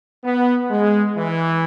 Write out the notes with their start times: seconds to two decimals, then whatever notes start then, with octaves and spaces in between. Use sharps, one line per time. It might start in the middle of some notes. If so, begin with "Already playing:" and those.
0.24 B3
0.70 G#3
1.15 E3